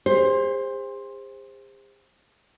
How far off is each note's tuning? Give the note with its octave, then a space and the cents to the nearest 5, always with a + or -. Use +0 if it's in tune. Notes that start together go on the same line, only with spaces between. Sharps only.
G#4 -45 C5 +10